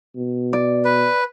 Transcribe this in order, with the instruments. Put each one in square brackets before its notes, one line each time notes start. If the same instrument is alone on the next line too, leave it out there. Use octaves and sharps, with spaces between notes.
[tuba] B2
[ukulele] D5
[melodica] B4